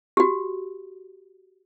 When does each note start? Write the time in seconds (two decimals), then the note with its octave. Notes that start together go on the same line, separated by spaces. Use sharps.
0.17 F#4 G4